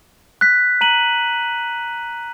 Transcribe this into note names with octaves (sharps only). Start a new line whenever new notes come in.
F#6 B6
A#5 D#7 F#7